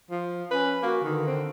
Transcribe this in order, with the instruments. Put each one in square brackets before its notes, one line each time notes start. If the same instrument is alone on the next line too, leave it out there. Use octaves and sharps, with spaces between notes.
[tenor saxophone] F3
[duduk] C#4 [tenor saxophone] B4
[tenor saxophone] A#3 [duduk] F#4
[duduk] D3 [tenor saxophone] D#3
[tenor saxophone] C4